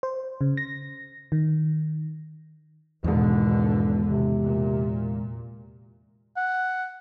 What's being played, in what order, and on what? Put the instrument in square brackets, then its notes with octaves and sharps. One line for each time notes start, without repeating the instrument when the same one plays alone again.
[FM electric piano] C5
C#3
A#6
D#3
[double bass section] G#1 B2 D3 [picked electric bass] E2 G#3
[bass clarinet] C3
[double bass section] A#2
[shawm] F#5